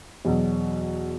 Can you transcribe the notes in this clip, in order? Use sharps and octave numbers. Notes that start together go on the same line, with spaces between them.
E2 B2 F#3